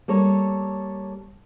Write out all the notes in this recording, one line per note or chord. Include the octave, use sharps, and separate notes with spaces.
G3 A#3 A4 C#5